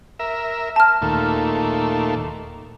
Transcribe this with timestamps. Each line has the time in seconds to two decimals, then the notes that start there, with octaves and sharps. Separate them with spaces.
0.19 A#4 E5
0.76 A5 F6
1.02 D#2 A#2 A3